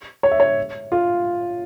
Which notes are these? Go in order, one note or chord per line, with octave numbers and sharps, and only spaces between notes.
C#5
E5
C#5
F4